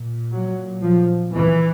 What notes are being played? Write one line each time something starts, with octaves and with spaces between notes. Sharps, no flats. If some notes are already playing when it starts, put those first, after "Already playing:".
Already playing: A#2
F#3
F3
E3